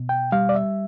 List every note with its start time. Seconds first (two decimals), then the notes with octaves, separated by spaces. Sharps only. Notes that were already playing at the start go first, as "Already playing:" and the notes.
Already playing: B2
0.09 G5
0.32 G3 F5
0.49 D5
0.55 E5